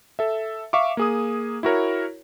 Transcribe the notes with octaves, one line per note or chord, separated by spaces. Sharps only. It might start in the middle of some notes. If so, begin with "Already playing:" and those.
A4 E5
E5 F5 C#6 D6
A#3 G#4 D#6
E4 F#4 A#4 C#5